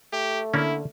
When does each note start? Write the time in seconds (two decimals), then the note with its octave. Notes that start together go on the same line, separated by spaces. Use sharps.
0.12 A3 G4
0.54 D3 A#3 C#4 E4